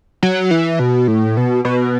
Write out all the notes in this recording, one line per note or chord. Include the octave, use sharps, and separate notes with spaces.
F#3
E3
B2
A2
B2
B2